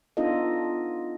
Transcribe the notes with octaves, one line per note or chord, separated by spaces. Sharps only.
B3 D4 D#4 F4 A4 D#5